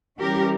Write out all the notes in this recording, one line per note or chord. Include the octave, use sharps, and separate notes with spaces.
E3 G3 C#4 G4 A#4